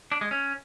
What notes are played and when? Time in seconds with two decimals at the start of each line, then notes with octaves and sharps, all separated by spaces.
0.12 D4
0.21 G#3
0.31 C#4